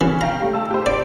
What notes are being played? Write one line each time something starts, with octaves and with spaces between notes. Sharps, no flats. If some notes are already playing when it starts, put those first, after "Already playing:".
E3 C#4
F5 G5 A#5
G3 A3
A5 E6
G4 C5
D5 D7